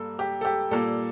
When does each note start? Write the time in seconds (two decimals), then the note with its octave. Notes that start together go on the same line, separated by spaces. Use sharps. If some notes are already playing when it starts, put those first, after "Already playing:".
Already playing: G2 A#3 A4
0.19 G4
0.41 A4
0.45 G4
0.71 A#2 G3 A#3 A4